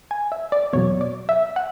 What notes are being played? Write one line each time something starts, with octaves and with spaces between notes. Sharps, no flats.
G#5
E5
D5
E2 B2 F#3 C#5
D5
E5
F#5